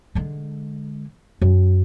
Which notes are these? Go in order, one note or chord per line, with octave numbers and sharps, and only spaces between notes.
D3 G#3
F#2